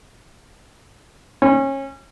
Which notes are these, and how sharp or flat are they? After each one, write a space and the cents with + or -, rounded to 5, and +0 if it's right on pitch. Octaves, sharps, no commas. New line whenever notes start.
C#4 -25